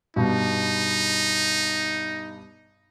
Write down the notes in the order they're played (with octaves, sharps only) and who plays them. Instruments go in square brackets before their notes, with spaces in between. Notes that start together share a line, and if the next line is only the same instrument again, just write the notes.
[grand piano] G2 B2 [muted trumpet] D#4